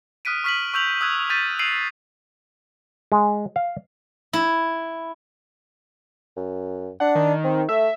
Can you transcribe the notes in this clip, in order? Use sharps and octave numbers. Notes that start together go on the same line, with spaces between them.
D#6 F6 F#6 B6 D7 D#7
C#6 F6 B6 D#7 F#7
C#6 E6 G6 F7 F#7
D#6 E6 F#6 G#6
C#6 G6 A6 B6 D#7
E6 C7 D7 D#7 F7 F#7
G#3
F5
E4
F#2
D4 F#5
D#3
C4
A3 E5